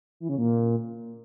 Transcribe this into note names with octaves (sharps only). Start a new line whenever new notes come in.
E3
C#3
A#2